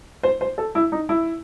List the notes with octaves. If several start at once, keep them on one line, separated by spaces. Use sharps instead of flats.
C5
C5
A4
E4
D#4
E4